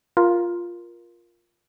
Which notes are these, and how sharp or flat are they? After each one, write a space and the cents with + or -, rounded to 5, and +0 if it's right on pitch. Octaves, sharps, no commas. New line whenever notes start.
F4 +0 A#4 +15